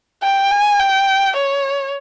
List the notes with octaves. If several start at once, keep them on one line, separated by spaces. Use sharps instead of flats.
G5
G#5
G5
C#5